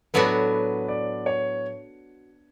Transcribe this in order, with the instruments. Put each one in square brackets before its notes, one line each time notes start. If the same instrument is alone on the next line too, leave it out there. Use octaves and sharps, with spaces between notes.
[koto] A2 F#3 B3 D4 F#4 [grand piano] B4
[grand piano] D5
C#5